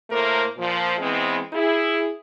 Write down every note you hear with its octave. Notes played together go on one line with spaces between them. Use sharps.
A2 A3 A#3 A#4 C5
A#2 F3
E3 G#3 B3 C4
E4 G#4